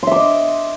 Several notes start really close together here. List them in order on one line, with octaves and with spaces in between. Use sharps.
C6 E5 D6 D#5